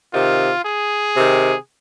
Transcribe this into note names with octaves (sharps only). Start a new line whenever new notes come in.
C3 D#3 F4
G#4
C3 D#3